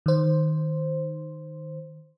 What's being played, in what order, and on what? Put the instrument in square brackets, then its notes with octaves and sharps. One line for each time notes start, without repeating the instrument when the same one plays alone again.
[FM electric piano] D#3 C5